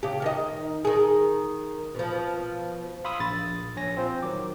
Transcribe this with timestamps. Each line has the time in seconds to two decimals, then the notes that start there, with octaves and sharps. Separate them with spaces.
0.03 C#3 G4
0.22 D#3 D#5
0.85 D#3 G#4
1.95 B2 F3
3.05 F5 B5 C6 D#6 E6
3.20 A#1 A6
3.77 A#1 C#5 G#5 A#6
3.97 C4 F4 C5
4.23 D#3 F#3 D6